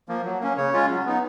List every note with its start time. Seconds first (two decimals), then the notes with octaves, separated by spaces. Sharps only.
0.08 F3 A#3
0.25 F#3
0.41 A#3 C#4
0.57 C#3 C#5
0.74 G#3 C#4 F4
0.90 F#3
1.05 B3 D#4